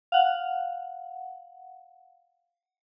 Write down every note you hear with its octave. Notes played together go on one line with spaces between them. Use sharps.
F5 F#5